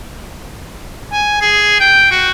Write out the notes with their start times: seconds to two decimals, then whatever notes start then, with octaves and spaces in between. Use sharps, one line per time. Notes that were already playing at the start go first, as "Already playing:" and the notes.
1.12 G#5
1.41 G#4
1.80 G5
2.11 F#4